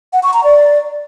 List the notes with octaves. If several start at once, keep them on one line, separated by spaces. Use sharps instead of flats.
F#5
C#6
A#5
D5